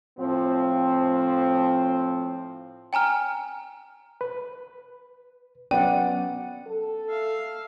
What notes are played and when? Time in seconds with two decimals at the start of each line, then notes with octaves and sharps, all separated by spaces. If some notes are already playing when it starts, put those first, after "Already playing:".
0.19 A2 F3 C4
2.93 G5 G#5 A#5 F6
4.21 B4
5.71 F#3 B3 C#4 D5 F#5 G5
6.67 A4
7.08 E5 F5